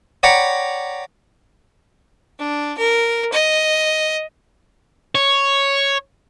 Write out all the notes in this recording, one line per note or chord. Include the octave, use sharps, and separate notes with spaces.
C#5 D5 F#5 G5 A#5 B5
D4
A#4
D#5
C#5